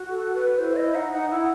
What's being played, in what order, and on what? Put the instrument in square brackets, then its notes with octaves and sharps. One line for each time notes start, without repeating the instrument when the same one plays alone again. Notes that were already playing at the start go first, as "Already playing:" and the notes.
Already playing: [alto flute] F#4
[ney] A4
B4
[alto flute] E4 [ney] C5
[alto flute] E4 [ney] D#5
[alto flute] D#4 [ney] F#5
[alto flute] D#4 [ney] F#5
[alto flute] E4 [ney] F#5